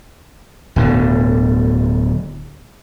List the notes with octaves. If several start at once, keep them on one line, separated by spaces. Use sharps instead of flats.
D1 B2 D3